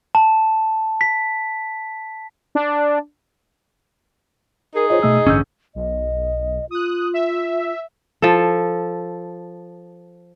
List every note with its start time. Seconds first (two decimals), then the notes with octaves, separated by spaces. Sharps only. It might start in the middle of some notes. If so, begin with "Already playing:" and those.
0.15 A5
1.01 B6
2.55 D4
4.75 D#4 G#4 A#4
4.90 F4 C5 C#5 D#5
5.03 B2 A3 D#5 E6
5.27 A1 G2 D3 C#4 E6 G6
5.75 B1 D#5
6.71 F4 D#6 F#6
7.14 E5
8.22 F3 A4